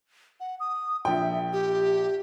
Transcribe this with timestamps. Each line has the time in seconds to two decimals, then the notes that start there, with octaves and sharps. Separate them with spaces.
0.40 F#5
0.60 D#6
1.05 A#1 E5 G5
1.52 G4